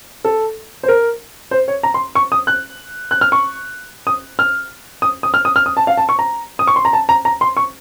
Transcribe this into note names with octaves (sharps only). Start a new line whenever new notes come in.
A4
C5
A#4
C5
C#5
A#5
C6
C#6
D#6
F#6
F#6
F6
C#6
D#6
F6
D#6
D#6
F6
D#6
F6
D#6
A5
F5
A5
C#6
A#5
D#6
C#6
C6
A#5
A5
A#5
A#5
C6
C#6